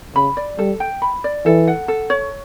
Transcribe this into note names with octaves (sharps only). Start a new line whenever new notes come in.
C#3 B5
D5
G3 A4
G5
B5
D5
E3 A4
F#5
A4
C#5